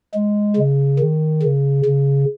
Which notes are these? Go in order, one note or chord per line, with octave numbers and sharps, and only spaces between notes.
G#3
C#3
D#3
C#3
C#3